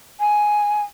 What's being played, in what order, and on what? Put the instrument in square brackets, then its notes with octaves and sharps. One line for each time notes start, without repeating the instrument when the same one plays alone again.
[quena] G#5